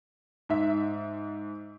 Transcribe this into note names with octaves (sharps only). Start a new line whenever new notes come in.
G#2 E5